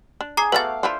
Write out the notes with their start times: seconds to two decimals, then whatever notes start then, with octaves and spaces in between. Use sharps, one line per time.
0.21 D4
0.37 G#4 A#5 D6 C7
0.52 A3 B3 C4 F#4 B4 F5 D6 A6
0.83 D4 E4 F4 C5